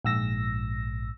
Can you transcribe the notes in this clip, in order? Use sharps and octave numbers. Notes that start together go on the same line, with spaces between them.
A#1 G#2 E6 A#6